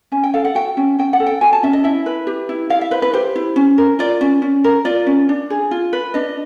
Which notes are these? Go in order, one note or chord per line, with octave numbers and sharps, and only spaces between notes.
C#4 G#5
G5
A4 F5
F#5
F#4 G5
C#4
C#4 G5
F#5
A4
G5
F#4 G#5
A5
C#4 E5
D#5
E4 E5
B4
G4
E4
E4 F5
E5
B4 C5
B4
G4 C5
E4
C#4
A#4
F4 D5
C#4
C#4
A#4
F4 D5
C#4
D4
G#4
F4
B4
D4 D#5